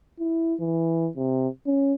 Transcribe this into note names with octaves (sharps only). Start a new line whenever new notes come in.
E4
E3
C3
C#4